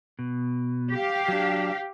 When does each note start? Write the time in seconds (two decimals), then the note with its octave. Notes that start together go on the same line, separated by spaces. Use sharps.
0.19 B2
0.93 G4 F5
1.28 F#3 D4